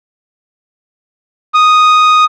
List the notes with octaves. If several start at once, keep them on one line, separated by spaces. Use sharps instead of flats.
D#6